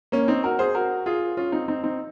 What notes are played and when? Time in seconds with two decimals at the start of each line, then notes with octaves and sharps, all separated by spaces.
0.12 A#3 C#4
0.28 C4 D#4
0.44 F#4 A#4
0.59 G#4 C5
0.75 F#4 A#4
1.06 F4 G#4
1.37 C#4 F4
1.52 C4 D#4
1.68 C4 D#4
1.84 C4 D#4